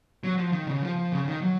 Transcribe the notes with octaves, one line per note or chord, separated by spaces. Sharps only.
F#3
F3
D#3
C#3
F3
F3
C#3
D#3
F#3